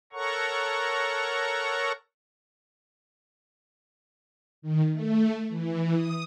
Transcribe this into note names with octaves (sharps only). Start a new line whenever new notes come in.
A4 A#4 C#5 F#5 A#5 C#6
D#3
A3
E3
D#6